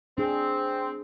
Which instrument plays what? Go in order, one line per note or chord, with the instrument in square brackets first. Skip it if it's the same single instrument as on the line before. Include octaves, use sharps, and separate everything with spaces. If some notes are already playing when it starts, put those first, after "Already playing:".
[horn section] C4 [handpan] D4 G#4